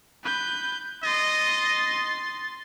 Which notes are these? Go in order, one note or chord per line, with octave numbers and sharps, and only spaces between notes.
B4 G6
D#5 C6 A6